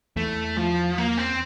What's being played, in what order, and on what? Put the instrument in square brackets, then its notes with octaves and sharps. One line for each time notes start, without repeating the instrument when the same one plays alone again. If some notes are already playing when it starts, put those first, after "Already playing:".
[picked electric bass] E2 [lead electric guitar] A3
[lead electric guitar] F3
A#3
C4